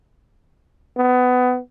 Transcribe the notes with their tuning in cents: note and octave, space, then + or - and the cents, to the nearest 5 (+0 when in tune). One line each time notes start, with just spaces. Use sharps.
B3 +20